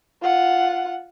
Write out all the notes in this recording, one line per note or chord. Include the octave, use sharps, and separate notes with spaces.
F4 F#5